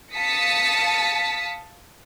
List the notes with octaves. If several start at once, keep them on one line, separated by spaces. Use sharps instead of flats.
F5 A5 D#6 B6 C#7